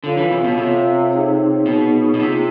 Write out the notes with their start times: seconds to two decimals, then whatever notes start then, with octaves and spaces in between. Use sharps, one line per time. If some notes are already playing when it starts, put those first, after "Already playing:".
0.04 D3 F4 A4 C#5 F5
0.17 E3
0.31 C3
0.44 B2
0.58 C3 F4 A4 C#5 F5
1.12 D#4 G#4 C#5
1.66 B2 D#4 G#4 C#5
2.14 B2
2.20 C3 A#3 D4 F4 G#4